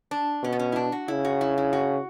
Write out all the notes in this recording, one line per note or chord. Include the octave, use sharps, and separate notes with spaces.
D4
B2 C#4
B3
C#4
E4
D4
F#4
C#3 E4
F#4
E4
E4
F#4